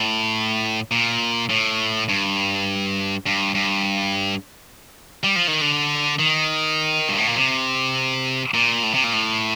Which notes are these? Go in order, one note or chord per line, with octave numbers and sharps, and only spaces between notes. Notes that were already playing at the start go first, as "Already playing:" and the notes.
Already playing: A2
A#2
A2
G2
G2
G2
G3
F3
D#3
D3
D#3
G2
A2
A#2
C3
A#2
A2
C3
A#2
A2